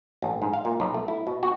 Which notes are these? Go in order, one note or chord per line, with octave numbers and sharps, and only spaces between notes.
A1
G#2
F5
A#2
B1
A3
E4
B2
F#4